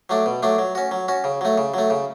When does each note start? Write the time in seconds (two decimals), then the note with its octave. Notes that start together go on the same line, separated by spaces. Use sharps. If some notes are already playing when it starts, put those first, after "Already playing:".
0.09 F#3 A3 D4
0.26 B2
0.43 F#3 A3 D4
0.58 F#3
0.75 C#4 F#4
0.91 F#3
1.08 C#4 F#4
1.24 C#3
1.41 F#3 A3
1.58 C#3
1.74 F#3 A3
1.90 C#3